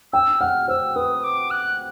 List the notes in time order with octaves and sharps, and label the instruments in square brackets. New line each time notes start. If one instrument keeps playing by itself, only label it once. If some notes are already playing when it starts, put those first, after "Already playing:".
[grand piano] G5 [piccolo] E6
[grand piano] F#5 [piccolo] F6
[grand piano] C5 [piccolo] E6
[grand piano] B4 [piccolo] D#6
[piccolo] D6
F#6